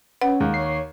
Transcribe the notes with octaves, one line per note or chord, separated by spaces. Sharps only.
C#4 B4 F#5
D#2 G#3
C#5 C7